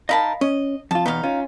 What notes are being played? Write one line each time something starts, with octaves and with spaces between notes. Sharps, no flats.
D#4 A#4 D#5 F5 A5 B5
C#4 D#5
F2 F4 A5
E2 B2 B3 D#4 F5
C#4 F4